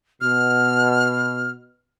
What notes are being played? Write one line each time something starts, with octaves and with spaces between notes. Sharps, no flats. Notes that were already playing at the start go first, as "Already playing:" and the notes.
B2 F6